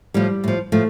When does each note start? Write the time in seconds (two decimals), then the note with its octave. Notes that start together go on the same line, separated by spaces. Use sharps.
0.14 A2 F3 G3
0.44 A2 F3
0.72 A2 F3 A3